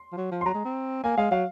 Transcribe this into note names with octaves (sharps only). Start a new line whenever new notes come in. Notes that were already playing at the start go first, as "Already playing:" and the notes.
Already playing: C6
F3
F#3
F3
C6
F#3 A#5
G#3
C4
A#3 G#5
G#3 F5
F#3 F5